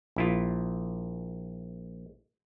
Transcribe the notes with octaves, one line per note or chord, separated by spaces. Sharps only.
A#1 E4 F4